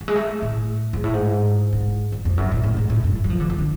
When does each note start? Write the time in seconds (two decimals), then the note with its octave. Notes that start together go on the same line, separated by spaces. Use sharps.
0.01 F#3
0.08 G#3
0.16 A3
0.42 A2
0.93 G#2
1.04 A2
1.14 G#2
1.73 G#2
2.12 F#2
2.25 F2
2.37 F#2
2.52 A2
2.63 A2
2.77 G#2
2.90 A2
3.04 F#2
3.24 F#3
3.30 F3
3.40 D3
3.50 F3
3.58 D3